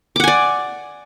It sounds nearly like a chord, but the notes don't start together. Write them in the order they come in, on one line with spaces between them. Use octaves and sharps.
D6 F#5 G#5 D5